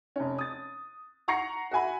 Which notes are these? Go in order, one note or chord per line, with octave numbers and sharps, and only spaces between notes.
F1 C#4
D#6 A6
F#5 A#5 C#6 A#6 C7 C#7
F#4 E5 G#5 B5